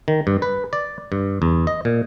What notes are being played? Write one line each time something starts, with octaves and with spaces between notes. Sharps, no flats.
D#3
G2
B4
D5
G2
E2
D#5
A#2